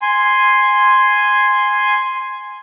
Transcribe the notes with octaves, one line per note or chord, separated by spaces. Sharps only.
G#5 C6